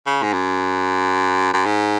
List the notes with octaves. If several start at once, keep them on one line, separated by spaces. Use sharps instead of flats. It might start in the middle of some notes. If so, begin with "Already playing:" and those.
C#3
G#2
F#2
F#2
G#2